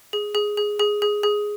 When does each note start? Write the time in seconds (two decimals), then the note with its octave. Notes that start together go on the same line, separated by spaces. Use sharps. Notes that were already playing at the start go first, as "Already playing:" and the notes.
0.13 G#4
0.35 G#4
0.57 G#4
0.79 G#4
1.02 G#4
1.23 G#4